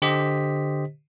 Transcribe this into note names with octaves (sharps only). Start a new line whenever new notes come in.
D3 G4 C5 D#5 B6